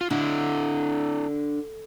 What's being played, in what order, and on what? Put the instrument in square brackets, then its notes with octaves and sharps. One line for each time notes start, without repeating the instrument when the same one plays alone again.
[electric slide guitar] F4
[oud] D3 [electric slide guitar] D4 E4